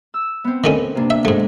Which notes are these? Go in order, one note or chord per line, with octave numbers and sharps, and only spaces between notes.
E6
B3 C4
D#3 A3 C#4
C3 A#3 D4
E5
G#2 G#3 A3